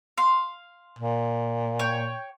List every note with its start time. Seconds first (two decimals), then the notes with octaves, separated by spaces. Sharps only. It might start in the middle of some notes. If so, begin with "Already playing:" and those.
0.18 F5 C6
0.99 A#2
1.79 C#5 G5